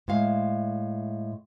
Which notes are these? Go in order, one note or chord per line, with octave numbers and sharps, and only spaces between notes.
A2 G#3 F5